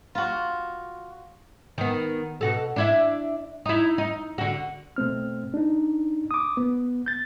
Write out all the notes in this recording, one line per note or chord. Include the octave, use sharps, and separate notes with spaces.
F4 F#4
D#3 B3
B2 F#4 A4
D4 E4 E5
D#4 E4
D#4
D3 F#4
B2 A3 C4 F6
D4 D#4
D6 D#6
B3
G6 A6